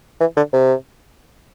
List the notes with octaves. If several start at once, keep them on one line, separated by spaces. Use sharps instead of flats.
E3
D3
C3